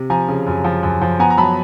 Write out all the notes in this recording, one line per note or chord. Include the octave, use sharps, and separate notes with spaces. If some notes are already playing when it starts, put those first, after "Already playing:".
Already playing: C3
F3 G#5 A#5
C#3
F#2
F3
F#2
F3
B3 G#5 A#5
A#5
F#3 A5 B5